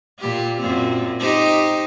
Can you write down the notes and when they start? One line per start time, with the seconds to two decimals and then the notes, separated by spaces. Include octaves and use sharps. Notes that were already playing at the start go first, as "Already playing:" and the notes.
0.20 A#2 G4
0.59 F#2 A#2 C4
1.19 D#4 G4 C5